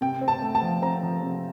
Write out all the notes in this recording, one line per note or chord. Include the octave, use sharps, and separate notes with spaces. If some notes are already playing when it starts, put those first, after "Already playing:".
C3 G5
C4
A5
A3
A5
F3
C4 A#5
F3
C3